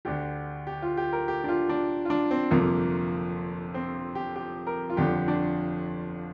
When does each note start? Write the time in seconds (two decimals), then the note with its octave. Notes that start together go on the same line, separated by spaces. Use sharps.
0.05 D2 D3 G4
0.67 G4
0.82 F4
0.97 G4
1.13 A#4
1.28 G4
1.44 D4
1.48 F4
1.69 D4
2.05 F4
2.10 D4
2.31 C4
2.51 G1 F2 C3 A#3
3.74 C4
4.15 G4
4.36 G4
4.67 A#4
4.90 F4
4.97 G1 F2 D3 G4
5.28 D4